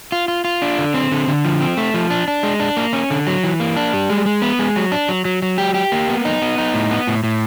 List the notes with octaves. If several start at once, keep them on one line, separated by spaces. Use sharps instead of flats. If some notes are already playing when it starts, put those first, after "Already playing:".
F4
F4
F4
D4
D3
C4
D3
D3
F3
C4
A3
F3
D4
D4
G#3
D4
A#3
C#4
D3
F#3
E3
A#3
D4
G3
G#3
G#3
B3
G#3
F#3
D4
F#3
F#3
F#3
G4
G4
A#3
B3
D#4
B3
D#4
A2
B3
A2
A2